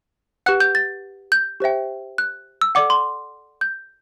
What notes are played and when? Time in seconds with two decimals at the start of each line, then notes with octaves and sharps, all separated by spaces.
0.46 G4 B4 F#5 F#6
0.60 G6
0.75 A6
1.32 G6
1.60 G4 C5 E5 G5
2.18 F#6
2.61 E6
2.75 A4 D5 F#5 D6
2.90 C6
3.61 G6